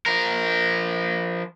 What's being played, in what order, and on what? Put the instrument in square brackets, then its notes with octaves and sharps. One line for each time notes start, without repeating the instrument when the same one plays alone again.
[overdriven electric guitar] F3 A#4